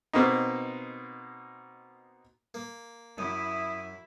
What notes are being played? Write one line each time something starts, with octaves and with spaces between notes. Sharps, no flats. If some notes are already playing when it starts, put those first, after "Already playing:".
B2 A#3 C4 D#4
A#3
F#2 E4 D#6